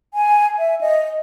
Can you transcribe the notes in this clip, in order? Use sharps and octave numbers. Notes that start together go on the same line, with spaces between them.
G#5
E5
D#5